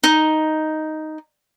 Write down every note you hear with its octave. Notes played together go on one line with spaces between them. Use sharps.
D#4